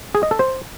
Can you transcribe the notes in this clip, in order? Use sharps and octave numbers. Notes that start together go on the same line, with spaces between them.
G#4
D#5
A4
C5